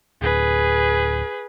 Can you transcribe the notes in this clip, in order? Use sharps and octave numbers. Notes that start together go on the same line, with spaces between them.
D1 G#4 B4